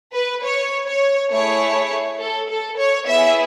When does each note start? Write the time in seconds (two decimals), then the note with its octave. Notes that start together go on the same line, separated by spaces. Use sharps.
0.13 B4
0.42 C#5
0.87 C#5
1.31 A3 E4 G#4 C#5
2.20 A4
2.49 A4
2.78 C#5
3.07 B3 E4 G#4 E5